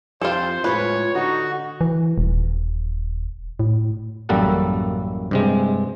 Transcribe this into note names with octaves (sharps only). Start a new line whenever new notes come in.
F2 F4 G4 A4 C5 C6
A2 G#3 F4 B4 C#5
D3 D#4 F#4
E3
D#1
A2
A1 F#2 G3 A#3 A4 F#5
G2 C3 G#3